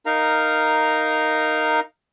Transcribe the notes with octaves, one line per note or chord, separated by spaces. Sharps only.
D#4 A#4 F5 A#5